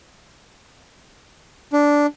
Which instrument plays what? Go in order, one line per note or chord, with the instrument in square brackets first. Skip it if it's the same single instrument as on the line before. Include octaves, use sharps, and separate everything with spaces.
[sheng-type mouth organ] D4